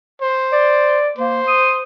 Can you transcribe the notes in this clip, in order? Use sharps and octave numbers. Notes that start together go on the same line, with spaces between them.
C5
D5
A#3 C5
D#6